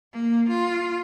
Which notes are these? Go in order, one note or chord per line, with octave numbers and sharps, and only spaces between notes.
A#3
F4